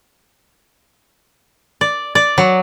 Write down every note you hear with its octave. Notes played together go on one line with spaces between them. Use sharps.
D5
D5
F#3